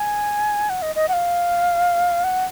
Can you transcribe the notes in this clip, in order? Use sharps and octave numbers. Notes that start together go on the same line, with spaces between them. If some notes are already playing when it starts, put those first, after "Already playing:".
Already playing: G#5
F#5
D#5
D#5
F#5
F5
F#5